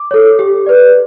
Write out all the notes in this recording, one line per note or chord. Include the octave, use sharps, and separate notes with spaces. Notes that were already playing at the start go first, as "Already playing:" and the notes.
Already playing: D6
A4 C#5
G4
B4 D5